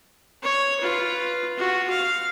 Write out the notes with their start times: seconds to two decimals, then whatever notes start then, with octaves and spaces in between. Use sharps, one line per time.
0.43 C#5
0.81 F4 B4
1.57 F4 F#4
1.90 F5